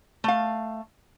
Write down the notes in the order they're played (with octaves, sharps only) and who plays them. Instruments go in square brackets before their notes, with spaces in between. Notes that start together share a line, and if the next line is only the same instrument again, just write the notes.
[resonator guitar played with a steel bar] A3 F5